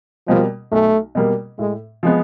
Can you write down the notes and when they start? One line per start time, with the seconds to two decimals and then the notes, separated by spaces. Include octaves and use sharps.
0.28 B2 F3 G3 A#3
0.72 B1 A3
1.15 B2 G3 A#3
1.59 A2 G#3
2.03 F3 G#3 B3